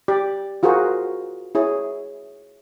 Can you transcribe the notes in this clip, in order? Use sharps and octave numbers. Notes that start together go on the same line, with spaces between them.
G4 D5
F4 F#4 G#4 A#4 C5
E4 G#4 C#5